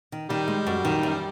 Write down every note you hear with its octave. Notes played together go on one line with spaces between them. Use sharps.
D#3
D#3 G3
G#3
F#2
D#3
F#2